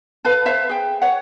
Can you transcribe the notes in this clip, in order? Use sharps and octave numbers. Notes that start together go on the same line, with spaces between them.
A4 B4 F5
B4 C5 E5 F5
G#4 G5
C#5 F#5